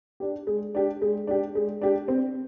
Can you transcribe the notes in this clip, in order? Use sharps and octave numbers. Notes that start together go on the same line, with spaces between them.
D4 G4
G#3
D4 G4
G#3
D4 G4
G#3
D4 G4
C4